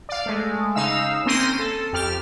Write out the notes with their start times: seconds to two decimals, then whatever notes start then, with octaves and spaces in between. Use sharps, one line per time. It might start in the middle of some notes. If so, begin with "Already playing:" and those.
0.09 D5 F5
0.26 G#3 A3
0.75 C#3 D#4 F5 E6
1.26 A#3 C4 C#4 C6 A#6 D#7
1.59 A4
1.93 F2 G4 F6